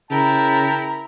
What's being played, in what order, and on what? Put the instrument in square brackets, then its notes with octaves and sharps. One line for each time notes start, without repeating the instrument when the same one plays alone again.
[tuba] C#3 [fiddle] E4 [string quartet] A#4 [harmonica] G5 A5